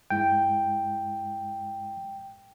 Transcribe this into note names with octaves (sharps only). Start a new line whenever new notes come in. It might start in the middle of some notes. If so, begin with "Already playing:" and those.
G2 G#3 E4 G5